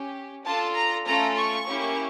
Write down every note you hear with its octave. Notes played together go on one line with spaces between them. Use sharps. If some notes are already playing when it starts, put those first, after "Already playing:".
Already playing: C#4 G4
D4 F4 A4 A5
A#5
A3 C#4 F4 A4 A#5
C#6
A#3 C#4 E4 G4